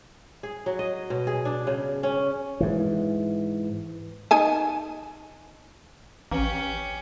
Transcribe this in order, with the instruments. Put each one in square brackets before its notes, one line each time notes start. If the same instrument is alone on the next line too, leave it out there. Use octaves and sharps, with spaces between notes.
[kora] G#4
F#3
D#5
B2
G#4
D4
C#3
C#4
[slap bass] G#2 E3
[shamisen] D#4 G#5 A5
[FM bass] A1 [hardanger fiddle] C#4 G4